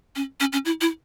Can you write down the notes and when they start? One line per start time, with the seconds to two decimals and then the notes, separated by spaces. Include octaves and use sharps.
0.16 C#4
0.40 C#4
0.53 C#4
0.65 E4
0.81 E4